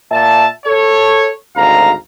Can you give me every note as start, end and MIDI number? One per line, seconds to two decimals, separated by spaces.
0.11 0.46 46
0.11 0.46 76
0.11 0.46 81
0.64 1.30 69
0.64 1.30 73
1.56 1.91 32
1.56 1.91 38
1.56 1.91 77
1.56 1.91 82